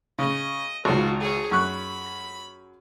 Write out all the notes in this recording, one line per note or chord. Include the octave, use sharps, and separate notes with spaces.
C#3 D#5
G#1 C#2 F4 F#4
G#4 C#5
F#2 B5 C#6 F#6